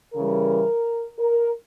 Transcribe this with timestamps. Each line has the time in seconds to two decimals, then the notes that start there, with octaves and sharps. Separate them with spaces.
0.14 C#3 E3 G3 A#4
1.19 A#4